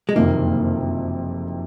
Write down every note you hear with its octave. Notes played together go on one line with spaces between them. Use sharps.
G#3
F#1 F2 C3 D#3 A#3